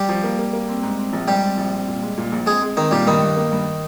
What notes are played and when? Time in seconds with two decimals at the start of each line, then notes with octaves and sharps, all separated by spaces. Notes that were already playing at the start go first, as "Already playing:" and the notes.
Already playing: G3 G4
0.09 F3
0.24 A#3
0.39 A#3
0.53 A#3
0.68 C4
0.83 G#2
0.98 C4
1.13 A#1
1.28 G#2 G3 G4
1.43 C4
1.57 A#1
1.72 C4
1.88 A#2
2.02 G#3
2.17 A#2
2.32 A#1
2.46 G#3 C4 G#4
2.62 G#3
2.77 D#3 C4 D#4
2.91 A#2 G3 G4
3.07 G2 D#3 D#4
3.22 G2
3.36 A#3
3.52 G2